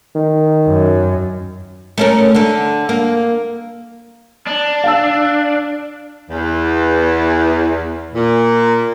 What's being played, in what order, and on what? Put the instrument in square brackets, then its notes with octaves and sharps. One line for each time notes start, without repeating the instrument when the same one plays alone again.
[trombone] D#3
[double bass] F#2
[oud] A3 C#4 A#4
D3 A4
A#3
[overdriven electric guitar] D4
[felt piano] F5 A5 E6
[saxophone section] E2
A#2